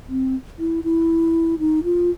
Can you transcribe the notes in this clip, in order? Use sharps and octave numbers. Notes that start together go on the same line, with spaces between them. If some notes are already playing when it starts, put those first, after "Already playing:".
C4
E4
E4
D#4
F4